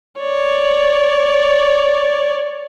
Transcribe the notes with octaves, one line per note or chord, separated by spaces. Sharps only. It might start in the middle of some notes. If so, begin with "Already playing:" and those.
C#5 D5